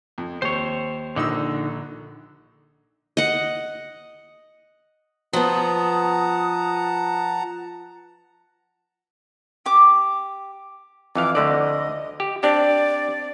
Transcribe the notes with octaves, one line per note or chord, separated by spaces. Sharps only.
F2
D#2 C5 C#5
A#1 D3 D#4 E6
D#5 F#5
F3 B3 F#5 A5 A#5 D#6
G4 D6
F2 E3 F5 D6
D2 D3 D5 D#5
G4
C4 D4 G4 D5